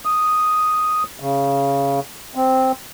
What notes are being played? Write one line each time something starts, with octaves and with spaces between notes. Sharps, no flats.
D#6
C#3
C4